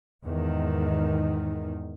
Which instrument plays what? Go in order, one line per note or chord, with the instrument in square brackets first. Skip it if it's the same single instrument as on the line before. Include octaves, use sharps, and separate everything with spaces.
[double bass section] E2 G#2 D#3